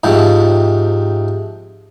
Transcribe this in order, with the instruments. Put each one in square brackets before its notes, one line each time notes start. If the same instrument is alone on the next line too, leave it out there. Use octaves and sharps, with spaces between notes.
[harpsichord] G#2 C3 F3